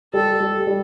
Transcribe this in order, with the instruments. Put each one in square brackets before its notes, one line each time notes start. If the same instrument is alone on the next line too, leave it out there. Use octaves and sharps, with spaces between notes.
[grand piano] G3 [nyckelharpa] A4
[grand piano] G3
G3